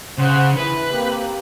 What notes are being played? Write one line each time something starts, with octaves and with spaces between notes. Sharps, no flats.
C#3 C5 F#5
E3 B4
A#3 C4 G4